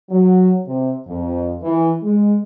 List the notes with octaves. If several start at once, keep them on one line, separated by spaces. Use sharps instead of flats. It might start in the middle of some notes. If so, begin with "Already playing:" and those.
F#3
C3
F2
E3
G#3